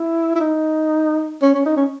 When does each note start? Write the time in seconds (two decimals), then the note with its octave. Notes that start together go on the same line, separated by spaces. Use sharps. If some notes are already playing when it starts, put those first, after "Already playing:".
Already playing: E4
0.36 E4
0.40 D#4
1.42 C#4
1.54 C#4
1.66 D#4
1.77 C#4